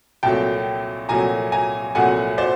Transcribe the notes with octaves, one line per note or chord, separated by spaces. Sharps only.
C2 A#2 F#3 A3 G5 A5
C2 A#2 F#3 A3 G#5 A#5
G#5 A#5
C2 A#2 F#3 A3 F#5 G#5
C5 D5